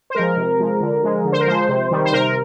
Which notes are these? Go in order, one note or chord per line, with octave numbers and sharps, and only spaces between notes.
C5
F3 G#3 A#4
C3
F3 G#3
D3
F3 G#3
D3
C5
A#4
F3 G#3 C5
C3
D#3 G3
C5
C3 A#4